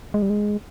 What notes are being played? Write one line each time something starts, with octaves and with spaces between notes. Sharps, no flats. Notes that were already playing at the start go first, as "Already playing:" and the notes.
G#3
G3
G#3